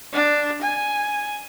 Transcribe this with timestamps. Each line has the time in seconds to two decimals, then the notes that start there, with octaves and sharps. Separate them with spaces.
0.13 D4
0.62 G#5